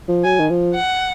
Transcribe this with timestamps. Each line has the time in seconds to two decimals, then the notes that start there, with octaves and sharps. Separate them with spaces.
0.08 F3
0.24 F#3 G#5
0.39 D#3
0.49 F3
0.74 F#5